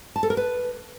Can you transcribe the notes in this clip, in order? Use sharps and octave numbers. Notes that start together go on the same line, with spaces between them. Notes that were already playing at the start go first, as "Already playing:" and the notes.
A5
A4
A#4
B4